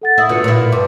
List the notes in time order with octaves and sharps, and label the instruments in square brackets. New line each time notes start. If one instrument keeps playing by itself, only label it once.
[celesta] A4 F#5 A6
[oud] E4 [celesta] D#6 E6
[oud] B2 D3 [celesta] F4 B4 C#7
[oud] A#2 E4
[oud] G2 [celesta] B4 C6 D6